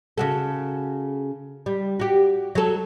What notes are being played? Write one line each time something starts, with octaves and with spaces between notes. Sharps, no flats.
C#3 F#4 A4
G3
F#4 G4
F#3 A4